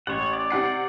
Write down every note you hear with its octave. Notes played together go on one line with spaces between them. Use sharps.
A1 C#5 F#5
D5
C3 F#5 C7